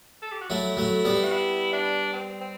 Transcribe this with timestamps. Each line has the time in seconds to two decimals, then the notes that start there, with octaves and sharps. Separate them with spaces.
0.22 A4
0.31 G4
0.41 F#4
0.50 F#3 A3 E4
0.77 F#3 A3
1.04 G3 B3
1.24 F#4
1.32 E4
1.73 D4
2.13 C4
2.41 C4